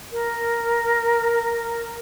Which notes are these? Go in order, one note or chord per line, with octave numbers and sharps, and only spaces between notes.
A#4